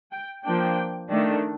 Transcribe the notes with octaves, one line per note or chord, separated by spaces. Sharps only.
G5
F3 A#3 D4 G5
D#3 A3 D4